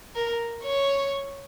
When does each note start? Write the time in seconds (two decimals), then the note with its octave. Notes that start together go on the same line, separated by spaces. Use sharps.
0.15 A#4
0.63 C#5